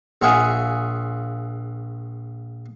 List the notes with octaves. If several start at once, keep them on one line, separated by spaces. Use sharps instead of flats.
A#1 F4 G#4 E5 F#5 G#5